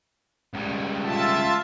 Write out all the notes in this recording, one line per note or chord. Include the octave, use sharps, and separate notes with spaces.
C#2 G3
F4 E5 A5